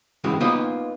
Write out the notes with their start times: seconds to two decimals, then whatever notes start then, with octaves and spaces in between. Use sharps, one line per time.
0.24 G2 C#3 E3 G#3 C4 F#4
0.40 A#3 B3 D#4 F4 C5 D#5